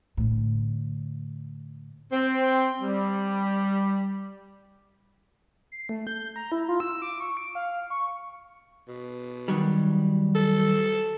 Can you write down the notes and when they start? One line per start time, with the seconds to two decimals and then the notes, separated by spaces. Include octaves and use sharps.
0.17 A2 D3
2.13 C4
2.82 G3
5.72 C7
5.89 A3
6.07 G6
6.36 A#5
6.52 E4
6.68 F4
6.80 E6
7.02 D6
7.20 C#6
7.37 D7
7.55 F5
7.90 C#6
8.88 B2
9.48 D#3 F#3 G3
10.35 A4